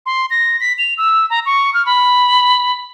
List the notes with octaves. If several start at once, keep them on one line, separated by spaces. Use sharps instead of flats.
C6
A#6
B6
F7
E6
A#5
C#6
F6
B5